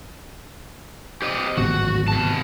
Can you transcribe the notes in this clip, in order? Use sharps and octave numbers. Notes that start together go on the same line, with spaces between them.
G4 C5 D#5
D1 G#1 B3 F#4
C3 A5